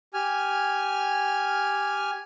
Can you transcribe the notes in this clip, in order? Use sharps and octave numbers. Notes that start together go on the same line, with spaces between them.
G4 G#5 F6